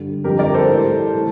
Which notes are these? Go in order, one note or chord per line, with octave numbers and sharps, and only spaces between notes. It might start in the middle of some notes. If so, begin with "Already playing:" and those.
Already playing: G2 D3 G3
F2 D3 G3 G4 A#4
A#4 D5
A4 C5
A2
G3
E3 A3